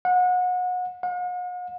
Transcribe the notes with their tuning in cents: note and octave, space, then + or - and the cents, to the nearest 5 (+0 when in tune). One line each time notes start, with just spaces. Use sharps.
F#5 -30
F#5 -45